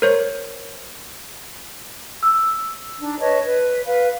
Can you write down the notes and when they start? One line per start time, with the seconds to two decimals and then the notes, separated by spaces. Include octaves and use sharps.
0.02 A#4 C5 C#5
2.23 E6
2.99 D4 D#4
3.20 B4 C#5 D#5 A5
3.43 B4
3.86 B4 F5